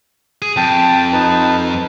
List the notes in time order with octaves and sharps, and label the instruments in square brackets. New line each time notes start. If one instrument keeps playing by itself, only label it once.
[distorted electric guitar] G#4
[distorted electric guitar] F2 [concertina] G5 A5
[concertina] D#4 B4 A5